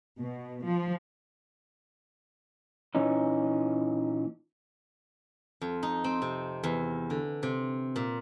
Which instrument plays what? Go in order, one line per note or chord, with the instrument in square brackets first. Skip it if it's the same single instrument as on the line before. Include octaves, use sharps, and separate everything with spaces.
[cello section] B2
F3
[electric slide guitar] A#2 E3 C#4 D#4
[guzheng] F2
D#4
C4
C3
E2
D3
C3
A#2